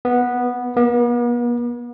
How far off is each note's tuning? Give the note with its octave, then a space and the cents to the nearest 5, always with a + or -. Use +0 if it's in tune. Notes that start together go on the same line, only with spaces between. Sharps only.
B3 -10
B3 -45